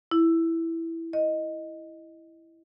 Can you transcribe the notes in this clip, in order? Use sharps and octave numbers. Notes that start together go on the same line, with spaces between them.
E4
D#5